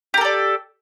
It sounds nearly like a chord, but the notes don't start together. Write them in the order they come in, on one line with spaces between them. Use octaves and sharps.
G4 A#4 A4 D5